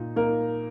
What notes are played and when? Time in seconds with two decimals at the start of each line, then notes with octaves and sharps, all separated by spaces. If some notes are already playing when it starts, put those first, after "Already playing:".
Already playing: A#2 D#4
0.16 A#3 D#4 A#4